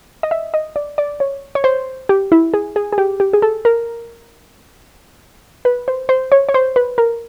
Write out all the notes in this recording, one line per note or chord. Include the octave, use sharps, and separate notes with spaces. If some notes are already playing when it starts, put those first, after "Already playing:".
D#5
E5
D#5
D5
D5
C#5
C#5
C5
G4
E4
G#4
G#4
G#4
G4
G4
G#4
A4
A#4
B4
C5
C5
C#5
C#5
C5
B4
A#4